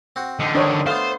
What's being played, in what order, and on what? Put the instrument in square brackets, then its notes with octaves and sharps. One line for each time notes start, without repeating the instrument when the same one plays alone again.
[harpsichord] C4 F#4
[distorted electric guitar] D3 D#4
[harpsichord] D#3 [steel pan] D4 C5 C#5
[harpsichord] A3 B3 [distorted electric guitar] C5 [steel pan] F5